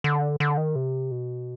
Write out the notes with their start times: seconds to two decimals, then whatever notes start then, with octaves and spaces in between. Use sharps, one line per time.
0.04 D3
0.40 D3
0.58 D#3
0.75 C3
1.11 B2